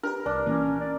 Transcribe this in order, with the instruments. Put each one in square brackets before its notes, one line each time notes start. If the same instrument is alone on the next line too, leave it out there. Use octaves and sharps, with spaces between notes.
[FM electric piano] D4 G4 B4 [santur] A#4
[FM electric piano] C2 [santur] D4
[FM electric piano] A#2 E3 A#3 [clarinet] C#4
[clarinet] D5